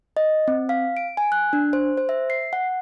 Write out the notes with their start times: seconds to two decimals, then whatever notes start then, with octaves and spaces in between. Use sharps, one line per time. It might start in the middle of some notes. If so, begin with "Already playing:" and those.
0.17 D#5
0.48 C4
0.69 F5
0.97 D7
1.17 G#5
1.32 F#6
1.53 D4
1.73 C5
1.97 C5
2.09 E5
2.30 C7
2.53 F#5